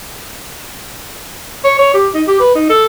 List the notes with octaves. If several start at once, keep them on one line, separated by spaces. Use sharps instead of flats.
C#5
C#5
G4
D#4
G4
B4
D#4
A4